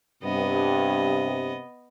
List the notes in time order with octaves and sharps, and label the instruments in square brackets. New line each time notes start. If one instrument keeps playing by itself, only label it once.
[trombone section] G2 [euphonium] C3 [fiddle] B3 D#5